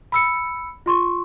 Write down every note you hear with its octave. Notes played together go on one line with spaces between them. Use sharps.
B5 E6 C#7
F4 C6 C#6